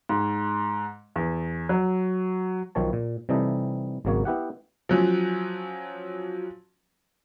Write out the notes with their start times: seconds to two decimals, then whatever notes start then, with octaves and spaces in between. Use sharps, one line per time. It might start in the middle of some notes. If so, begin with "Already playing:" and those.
0.09 G#2
1.16 E2
1.69 F#3
2.75 B1 D#3 F3 C#5 A5
2.93 A#2
3.29 C3 E3 G3 D#4 A4
4.05 G#1 C#3 F#3 A#3 C#5
4.25 B3 E4 G4 F#5
4.89 F3 F#3 C#4